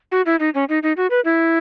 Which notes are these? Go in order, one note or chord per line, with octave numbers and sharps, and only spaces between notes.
F#4
E4
D#4
C#4
D#4
D#4
F#4
B4
E4